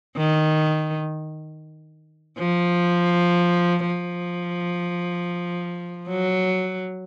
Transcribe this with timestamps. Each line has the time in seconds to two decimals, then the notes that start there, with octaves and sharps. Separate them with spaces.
0.17 D#3
2.39 F3
3.87 F3
6.09 F#3